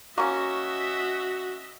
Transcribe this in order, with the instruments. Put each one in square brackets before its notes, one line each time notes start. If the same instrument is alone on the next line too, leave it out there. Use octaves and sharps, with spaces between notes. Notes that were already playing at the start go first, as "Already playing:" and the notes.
[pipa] A#3 C#4 [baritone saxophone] F#4 [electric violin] D#5 E5 [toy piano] C#6